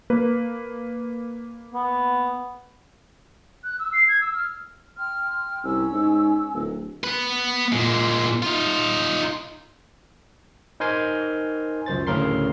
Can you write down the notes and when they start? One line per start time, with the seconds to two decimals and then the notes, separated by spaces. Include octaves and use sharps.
0.10 A#3 B4
1.74 B3
3.64 F#6
3.79 E6
3.92 C7
4.08 G#6
4.20 E6
4.34 F6
4.98 G5 C6 F6
5.64 C2 C#4 E6
5.93 G#2
6.54 D1
7.04 B3 B4
7.72 A#2 G#3
8.43 D#4 F4
10.80 D#4 A#4 C5 G#5 C6
11.86 C#2 F#2 C5 A6
12.07 D2 A2 C#3 A#4 C6 C7